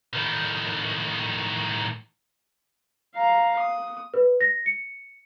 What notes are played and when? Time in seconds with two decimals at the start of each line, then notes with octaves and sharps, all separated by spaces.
0.14 A2 D#3
3.15 F5 A#5
3.59 D#6
4.14 B4
4.41 A#6
4.66 C#7